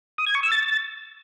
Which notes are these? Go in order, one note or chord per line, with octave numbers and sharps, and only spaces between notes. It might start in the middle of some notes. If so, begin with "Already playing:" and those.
D#6
G#6
C#6
E6
A6